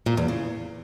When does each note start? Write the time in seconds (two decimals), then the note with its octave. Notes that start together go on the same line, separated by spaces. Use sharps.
0.06 A#2
0.17 E2
0.28 C#3